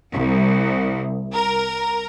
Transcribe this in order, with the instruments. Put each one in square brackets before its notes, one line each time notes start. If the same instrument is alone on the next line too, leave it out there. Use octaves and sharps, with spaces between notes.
[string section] C2
A#4